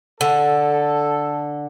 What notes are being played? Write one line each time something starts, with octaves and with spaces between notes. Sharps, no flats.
D3 A4